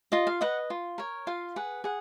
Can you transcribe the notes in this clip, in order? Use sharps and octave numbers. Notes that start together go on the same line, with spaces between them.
F4 D#5
F5
B4 D#5 F#5
F4
A#4 C#5
F4 F5
G#4 B4 F#5
G#4 F#5